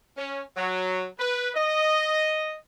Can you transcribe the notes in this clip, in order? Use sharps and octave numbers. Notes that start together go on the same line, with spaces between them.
C#4
F#3
B4
D#5